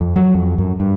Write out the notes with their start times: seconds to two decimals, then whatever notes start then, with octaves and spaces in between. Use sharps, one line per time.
0.01 F2
0.16 F#3
0.34 F2
0.58 F#2
0.80 G2